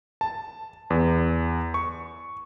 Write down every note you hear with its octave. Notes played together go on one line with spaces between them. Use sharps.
A5
E2
C#6